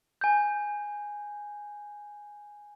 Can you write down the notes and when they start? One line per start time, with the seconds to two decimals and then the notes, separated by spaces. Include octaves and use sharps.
0.21 G#5 G6